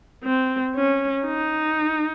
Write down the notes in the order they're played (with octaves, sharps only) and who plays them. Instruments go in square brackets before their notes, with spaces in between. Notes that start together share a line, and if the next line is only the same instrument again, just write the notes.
[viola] C4
C#4
D#4